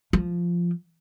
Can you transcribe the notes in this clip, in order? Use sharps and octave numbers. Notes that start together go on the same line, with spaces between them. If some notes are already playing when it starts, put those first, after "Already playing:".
F3